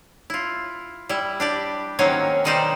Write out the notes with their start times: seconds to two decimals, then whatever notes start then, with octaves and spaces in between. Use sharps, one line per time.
0.30 E4 F4
1.09 G3 E4
1.40 D4 G4 D5
1.99 D#3 F#3 A#3 C4 C#4
2.44 B2 D#3 G3 D#4 C5 D5